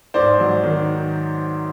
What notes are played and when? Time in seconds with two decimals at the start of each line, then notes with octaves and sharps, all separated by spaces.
0.14 G#2 C5 D5
0.40 F#3
0.63 D#3